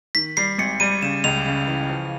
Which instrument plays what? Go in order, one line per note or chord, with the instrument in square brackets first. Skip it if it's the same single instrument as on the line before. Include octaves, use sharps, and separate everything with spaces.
[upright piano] D#3 [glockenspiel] B6
[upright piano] G3 [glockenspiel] C7
[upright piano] G#1 [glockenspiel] C#7
[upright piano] G3 [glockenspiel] D#7
[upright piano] C#3 [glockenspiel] E7
[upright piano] C#2 [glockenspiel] F7
[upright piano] C#3
E3
F3